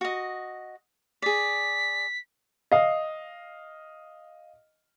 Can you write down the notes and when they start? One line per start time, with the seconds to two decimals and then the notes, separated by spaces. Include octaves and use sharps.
0.01 F#4 D#5
1.22 G#4 D5 B6
2.72 D#5 F5